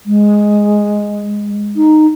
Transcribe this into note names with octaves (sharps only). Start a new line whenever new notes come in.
G#3
D#4